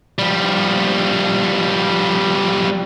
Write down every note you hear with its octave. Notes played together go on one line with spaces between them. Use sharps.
F3 G3